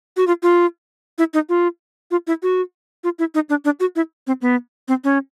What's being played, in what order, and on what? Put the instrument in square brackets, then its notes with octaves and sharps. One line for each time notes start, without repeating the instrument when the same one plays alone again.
[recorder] F#4
F4
F4
E4
D#4
F4
F4
E4
F#4
F4
E4
D#4
D4
D4
F#4
E4
C4
B3
C4
C#4